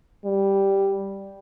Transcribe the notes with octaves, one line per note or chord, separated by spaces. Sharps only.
G3